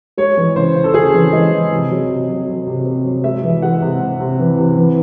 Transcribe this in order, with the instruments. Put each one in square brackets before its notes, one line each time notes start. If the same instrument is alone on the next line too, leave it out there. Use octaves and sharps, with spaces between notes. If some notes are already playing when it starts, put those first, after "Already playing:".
[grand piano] G#3 C#5
E3
C#3 C5
C#3
A4
C#3 G#4
E3
G#3 D#5
E3
C3
F#3
C3
F#3
F#3
C3
C3
F#3
G#3 E5
E3
G#3 F#5
C3
C3
C3
E3
C3
E3